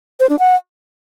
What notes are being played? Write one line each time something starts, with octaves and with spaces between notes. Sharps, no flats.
C5
D4
F#5